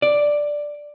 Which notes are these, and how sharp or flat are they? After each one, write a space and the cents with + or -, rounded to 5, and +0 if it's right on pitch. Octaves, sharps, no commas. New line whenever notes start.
D5 +0